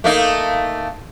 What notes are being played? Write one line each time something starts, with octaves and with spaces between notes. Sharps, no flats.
A3 A#3 D#4